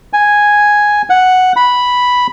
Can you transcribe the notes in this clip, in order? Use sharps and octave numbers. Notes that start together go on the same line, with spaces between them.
G#5
F#5
B5